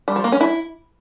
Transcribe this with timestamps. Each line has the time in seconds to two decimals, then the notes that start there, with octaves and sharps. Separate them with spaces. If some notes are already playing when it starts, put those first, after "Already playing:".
0.08 G3
0.16 F3
0.24 A#3
0.32 C#4
0.41 E4